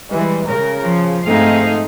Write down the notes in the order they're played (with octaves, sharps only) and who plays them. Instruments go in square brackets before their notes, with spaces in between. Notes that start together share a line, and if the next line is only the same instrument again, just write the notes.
[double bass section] E3 [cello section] G3 G#3
[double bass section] C#3 [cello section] A#4
[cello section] F3
[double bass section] G#2 A3 C4 [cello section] D#4 G#4 F5